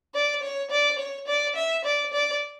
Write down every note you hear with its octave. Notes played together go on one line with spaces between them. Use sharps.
D5
C#5
D5
C#5
D5
E5
D5
D5